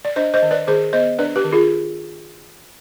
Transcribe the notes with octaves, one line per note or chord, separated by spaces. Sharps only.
D5
D4 C5 D#5
C5 D#5
D#3
B4 D5
D#3 G#4 C5
B3 C5 D#5
D4 B4 D5
G4 B4
D#3
F4 G#4